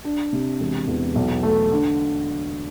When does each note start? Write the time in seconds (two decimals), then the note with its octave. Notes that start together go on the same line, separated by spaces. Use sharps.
0.05 D4
0.33 C3
0.60 E1
0.88 E2
1.15 B1
1.43 A3
1.71 D3